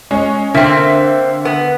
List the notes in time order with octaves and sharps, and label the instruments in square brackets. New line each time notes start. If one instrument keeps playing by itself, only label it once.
[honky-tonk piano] G#3 C#4
[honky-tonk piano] D3 E5 B6 [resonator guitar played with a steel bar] A#3 C4
[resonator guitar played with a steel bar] B3